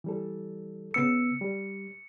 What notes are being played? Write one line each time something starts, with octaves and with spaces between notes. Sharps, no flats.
E3 G3 A4
C#3 B3 E6 C#7
G3